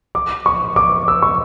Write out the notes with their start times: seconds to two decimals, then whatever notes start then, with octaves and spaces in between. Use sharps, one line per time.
0.15 D6
0.46 C#6
0.76 D6
1.08 E6
1.22 C#6